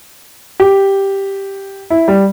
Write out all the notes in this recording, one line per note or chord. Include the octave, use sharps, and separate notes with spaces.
G4
E4
G3